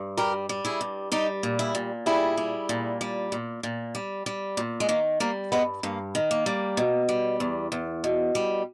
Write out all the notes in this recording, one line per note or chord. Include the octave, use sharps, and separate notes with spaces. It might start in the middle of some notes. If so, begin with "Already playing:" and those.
Already playing: G2
G3 G4 A#4
G3
E4 G#4
G2
G3 D#4 G4
A#2
E4 G#4
A#2
G3 E4 G#4
G3
A#2
G3
A#2
A#2
G3
G3
A#2
G#3
D#3 A#3
G3 A#3
G2 G#3 B3
G2 A#3
D#3
A#3
G3
B2
G3
E2
E2
B2
G3